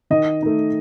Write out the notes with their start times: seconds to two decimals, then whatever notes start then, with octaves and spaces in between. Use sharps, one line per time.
0.10 D#3 D#5
0.42 A3 D#4